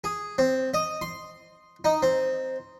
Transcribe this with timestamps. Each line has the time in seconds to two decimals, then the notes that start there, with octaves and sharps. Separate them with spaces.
0.04 G#4
0.38 C4
0.74 D#5
1.01 C6
1.84 D#4
2.03 C4